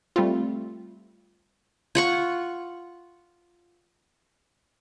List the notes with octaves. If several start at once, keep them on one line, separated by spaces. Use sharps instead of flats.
G3 A3 C4 F4
F4 F#5 C#6